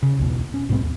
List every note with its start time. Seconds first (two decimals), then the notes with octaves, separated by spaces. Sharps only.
0.03 C#3
0.19 B1 E2 B2
0.54 C#4
0.69 B1 G#2 B3 C4
0.83 D#2